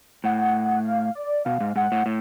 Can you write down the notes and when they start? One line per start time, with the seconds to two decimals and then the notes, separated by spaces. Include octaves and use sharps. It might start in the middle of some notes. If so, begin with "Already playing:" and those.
0.24 A2 F#5
0.85 F5
1.15 D5
1.45 B2 F5
1.60 G#2
1.76 G#2 F#5
1.92 A2
2.06 A2